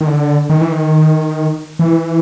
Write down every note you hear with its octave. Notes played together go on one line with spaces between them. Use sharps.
D#3
D3
D#3
E3
D#3
E3